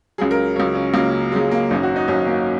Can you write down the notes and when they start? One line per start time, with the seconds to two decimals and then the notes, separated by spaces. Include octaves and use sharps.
0.18 C#2 C#3 F#3 G#4
0.31 A#4
0.56 C#2 C#3 F#3 C#5
0.75 C#4
0.94 C#2 C#3 F#3 A#3
1.32 C#2 C#3 F#3 G#3
1.52 A#3
1.71 G#1 F#2 F#3 D#4
1.83 F#4
1.96 D#4
2.08 G#1 F#2 F#3 C#4
2.27 A#3